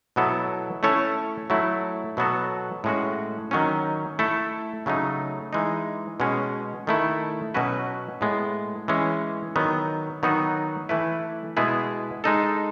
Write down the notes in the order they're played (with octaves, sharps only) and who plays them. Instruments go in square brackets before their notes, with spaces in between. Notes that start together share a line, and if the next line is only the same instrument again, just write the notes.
[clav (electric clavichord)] B2 F#3 B3 E4 A4
A3 C#4 E4 A4 C#5
F#3 A3 E4
B2 F#3 B3 F#4 A4
A2 G#3 C#4 F#4
D#3 F#3 C#4
A3 E4 A4
C#3 F#3 A3 D#4
E3 G#3 D#4
B2 G#3 C#4
D#3 A3 E4
B2 F#3 C#4 F#4 B4
A2 G#3 B3
E3 G#3 C#4
D#3 F#3 B3
D#3 F#3 B3 D#4 F#4
E3 A3 E4 B4
B2 G#3 B3 E4 G#4
G#3 D#4 A4